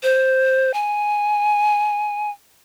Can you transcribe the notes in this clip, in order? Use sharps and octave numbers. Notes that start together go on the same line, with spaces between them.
C5
G#5